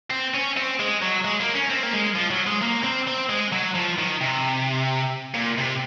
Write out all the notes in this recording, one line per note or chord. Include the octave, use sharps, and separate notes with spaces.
C4
C#4
C4
G#3
F#3
G#3
A#3
C#4
C4
A#3
G#3
F3
F#3
G#3
A#3
C4
C4
G#3
F#3
F3
D#3
C3
A#2
C3